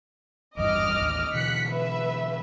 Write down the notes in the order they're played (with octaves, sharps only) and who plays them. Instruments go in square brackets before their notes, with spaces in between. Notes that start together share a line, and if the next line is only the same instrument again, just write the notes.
[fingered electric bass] G#1 E2 G2 [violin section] D#5 D6 F6
[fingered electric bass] A1 D#2
[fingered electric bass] B2 D3 E3 [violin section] F#6 B6 C#7
[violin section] B4 E5